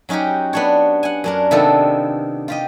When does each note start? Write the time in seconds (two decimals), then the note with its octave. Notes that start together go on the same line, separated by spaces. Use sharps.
0.09 F#3 C#4 D#4 F#4 G4
0.53 B3 D4 C#5
1.03 F#5 G#5
1.24 F#2 D4 A#4
1.51 C3 D#3 B3 D4 F4 A4
2.48 F4 G4 D#5